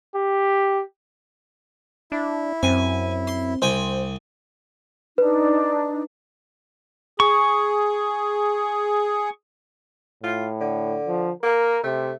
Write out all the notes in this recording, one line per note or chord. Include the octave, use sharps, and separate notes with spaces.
G4
D4 E4
F#2 C4 G#5
C6
C2 C5 G5 G#5
D4 D#4 B4
G#4 C#6
A2 F4
D3
F3
A#3 A#4
C3 A3